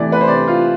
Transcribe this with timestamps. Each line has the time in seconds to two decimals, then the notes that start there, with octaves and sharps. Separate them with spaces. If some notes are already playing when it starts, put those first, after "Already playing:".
Already playing: C3 E3 A3 D5
0.12 B4
0.21 C5
0.28 C3 D5
0.48 F4